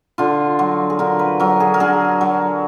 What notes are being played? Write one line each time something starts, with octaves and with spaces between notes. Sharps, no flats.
D3 F4
F#3
G#4
D3 A#4
B4
F#3 A#4
G#4
A#4
D3 G#4
F#3